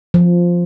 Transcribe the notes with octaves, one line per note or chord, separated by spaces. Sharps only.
F3